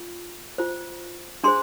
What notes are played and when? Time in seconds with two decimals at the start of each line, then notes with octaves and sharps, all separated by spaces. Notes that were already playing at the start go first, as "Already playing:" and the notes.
Already playing: F4
0.58 F4 C5
1.44 D4 G#4 C5 C6